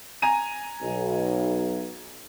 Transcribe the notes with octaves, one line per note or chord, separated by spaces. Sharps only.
G#5 A#5 D#7
B1